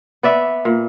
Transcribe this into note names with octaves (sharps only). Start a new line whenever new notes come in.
B3 D5 E5
A#2